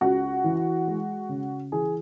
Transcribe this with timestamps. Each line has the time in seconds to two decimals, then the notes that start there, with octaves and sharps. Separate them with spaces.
0.01 C#2 F#4
0.44 E3
0.87 G#3
1.29 C#3
1.72 E3 G#4